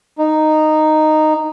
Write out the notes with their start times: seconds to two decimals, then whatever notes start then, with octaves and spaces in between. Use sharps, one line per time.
0.19 D#4